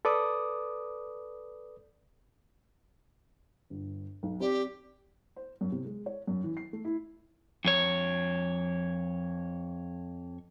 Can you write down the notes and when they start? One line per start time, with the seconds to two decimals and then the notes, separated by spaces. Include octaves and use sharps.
0.05 A4 B4 D5 D6 D#6
3.70 G1
4.23 B1
4.40 C4 G4 D5
5.36 C5
5.61 F#2
5.72 C3
5.84 G#3
6.06 C#5
6.27 F#2
6.44 E3
6.57 C7
6.73 A3
6.85 E4
7.65 F2 C#5